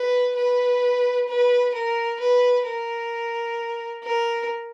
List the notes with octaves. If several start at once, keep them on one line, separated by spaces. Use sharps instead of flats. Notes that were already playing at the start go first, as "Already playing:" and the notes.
Already playing: B4
B4
B4
A#4
B4
A#4
A#4